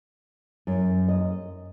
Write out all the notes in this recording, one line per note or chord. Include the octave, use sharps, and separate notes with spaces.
F#2
D#5